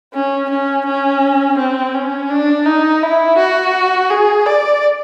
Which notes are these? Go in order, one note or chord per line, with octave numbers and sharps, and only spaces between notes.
C#4
C#4
C#4
C4
C#4
D4
D#4
E4
F#4
G#4
D5